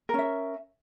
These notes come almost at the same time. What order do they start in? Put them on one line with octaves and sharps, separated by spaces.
A#4 C#4 E5